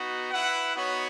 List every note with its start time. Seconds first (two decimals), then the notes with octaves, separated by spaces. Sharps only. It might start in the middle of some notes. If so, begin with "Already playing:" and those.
Already playing: B3 D#4 F#4
0.31 E4 B4 F#5
0.74 B3 D#4 F#4 C#5